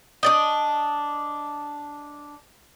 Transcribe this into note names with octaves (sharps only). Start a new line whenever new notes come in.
D4 D5 D#5